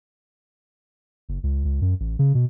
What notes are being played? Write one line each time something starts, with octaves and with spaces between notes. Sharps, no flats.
F#1
C#2
C#2
F#2
A1
C#3
B2